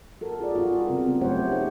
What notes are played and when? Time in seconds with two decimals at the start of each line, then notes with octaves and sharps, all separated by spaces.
0.21 F#4 A4 A#4
0.40 F4 G#4 D5
0.56 G3 F4 F#4
0.88 C#3 G3 B3 C4 F#4 A#4
1.21 F#3 A3 G4 C5 C#5 F#5
1.51 D#4 G4 G#4 C#5 F#5